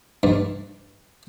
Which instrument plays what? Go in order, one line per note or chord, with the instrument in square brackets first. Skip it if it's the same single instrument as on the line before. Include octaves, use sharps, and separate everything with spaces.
[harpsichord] G2